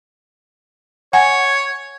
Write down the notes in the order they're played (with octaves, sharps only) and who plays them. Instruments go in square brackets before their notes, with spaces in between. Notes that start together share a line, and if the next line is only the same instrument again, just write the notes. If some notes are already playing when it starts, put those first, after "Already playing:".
[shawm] C#5 [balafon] F#5 G#5